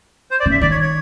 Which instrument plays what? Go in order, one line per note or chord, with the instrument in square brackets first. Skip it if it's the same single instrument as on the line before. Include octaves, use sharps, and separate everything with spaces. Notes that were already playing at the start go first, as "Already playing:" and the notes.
[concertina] C5
D5
[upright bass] C#3
[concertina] E5
[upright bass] D#3 [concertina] D5
[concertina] C#5
C#5